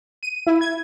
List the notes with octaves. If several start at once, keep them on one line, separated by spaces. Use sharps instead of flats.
D#7
E4
G#6